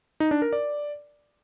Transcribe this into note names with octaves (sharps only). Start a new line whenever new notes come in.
D#4
D4
A#4
D5